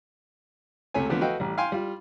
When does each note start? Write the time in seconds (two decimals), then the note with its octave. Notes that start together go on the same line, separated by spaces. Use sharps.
0.94 C#2 C3 A3 C#5 G#5
1.09 D3 E3 F3 A3 B3 C4
1.21 F#4 A4 B4 D#5 F5 G5
1.40 A1 G3
1.58 F5 G5 G#5 C6
1.72 G3 F4